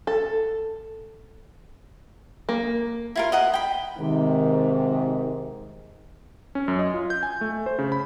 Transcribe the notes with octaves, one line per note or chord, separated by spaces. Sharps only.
A4
A#3
E4 F4 A#4
D#5 F#5 A#5
G5 B5
G#2 C3 D#3
C#4
F#2
D#5
F4
G6
G#5
A3
C5
C#3
B5